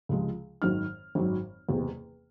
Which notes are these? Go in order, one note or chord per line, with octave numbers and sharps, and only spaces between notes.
C#2 C3 F3 G#3
G#1 F#2 D#3 F#3 F6
G#1 F#2 D#3 F#3
F#1 E2 C3